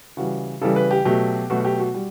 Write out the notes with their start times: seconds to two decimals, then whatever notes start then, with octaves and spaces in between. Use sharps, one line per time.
0.17 C#3 E3 G3 F#4
0.61 C#3 E3 G3 A4
0.76 B4
0.91 G4
1.05 B2 F#3 A3 G4
1.50 B2 F#3 A3 F#4
1.60 F#4
1.65 G4
1.80 F#4
1.94 G3